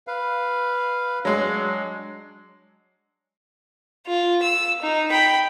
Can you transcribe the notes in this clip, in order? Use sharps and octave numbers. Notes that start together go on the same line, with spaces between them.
B4 F5
F#3 G#3 D4
F4
E6
D#4
G5 B5